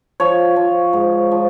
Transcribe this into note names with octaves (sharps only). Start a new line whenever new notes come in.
F3 C#5
F3
G#2
F3